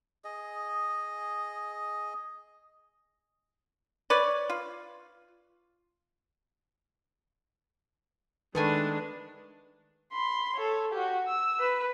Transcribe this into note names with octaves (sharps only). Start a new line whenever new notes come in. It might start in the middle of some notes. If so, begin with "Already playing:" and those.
G#4 D#5
B4 C#5 D5
F4
D#3 G#3 A3 D4 B4 G#5
B5 C6
A4 C#5
F#4 G4
E6
B4